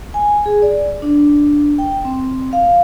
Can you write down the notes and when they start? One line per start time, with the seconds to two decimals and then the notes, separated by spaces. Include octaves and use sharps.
0.14 G#5
0.46 G#4
0.62 D5
1.02 D4
1.78 G5
2.05 C4
2.53 F5